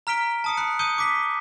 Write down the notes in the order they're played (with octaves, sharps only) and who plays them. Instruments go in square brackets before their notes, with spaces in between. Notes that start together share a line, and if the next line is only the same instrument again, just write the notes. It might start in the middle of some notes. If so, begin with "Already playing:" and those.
[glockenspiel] A#5 F6 B6 D7 G7
A5 D#6 C#7
B5 F#6 C#7
D#6 G6 C#7 D#7 G7
D6 B6 G7